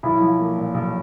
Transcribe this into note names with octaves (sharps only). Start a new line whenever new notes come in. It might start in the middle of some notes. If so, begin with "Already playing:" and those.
B1 E4
F3
A#3
A#2
B1